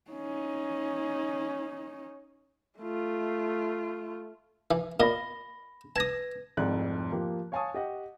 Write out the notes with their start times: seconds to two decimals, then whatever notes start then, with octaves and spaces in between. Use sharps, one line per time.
0.11 C#4 D#4
2.79 A3 F4
4.71 E3
5.00 A#2 D#5 B5 A#6 G7
5.96 B4 A5 D#6 G#6 A#6
6.57 F1 C2 F2 G#2 D5 F#6
7.12 F3 A#3 G4
7.52 C#5 F5 G#5 A5 C#6 D#6
7.74 G4 D#5 F#5 G5